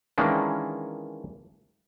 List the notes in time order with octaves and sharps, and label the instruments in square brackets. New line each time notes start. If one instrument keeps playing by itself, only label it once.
[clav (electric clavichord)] D#3 E3 G#3 A#3 C#4 D4